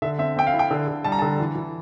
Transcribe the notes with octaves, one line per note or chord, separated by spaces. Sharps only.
D3 E5
C4 E5
C4 G5
F5
E4
G5
D3
D3
G3 A5
A#5
D3 A5
E3
E3